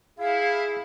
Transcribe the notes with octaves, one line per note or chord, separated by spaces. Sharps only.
E4 G#4 F5